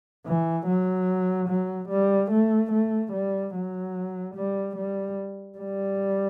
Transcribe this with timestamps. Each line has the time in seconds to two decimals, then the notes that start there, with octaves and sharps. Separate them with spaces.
0.26 E3
0.67 F#3
1.49 F#3
1.89 G3
2.32 A3
2.72 A3
3.13 G3
3.54 F#3
4.35 G3
4.76 G3
5.58 G3